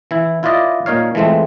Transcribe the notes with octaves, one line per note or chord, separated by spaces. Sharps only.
E3 E4
E4 F4 B4 D5 D#5
A#2 D#4 C#5 F5
E3 F3 G#3 A3 C4